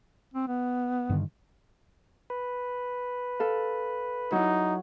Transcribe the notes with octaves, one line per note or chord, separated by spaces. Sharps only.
C4
B3
G2 D3 D#3
B4
A4 F5
F#3 D#4 E4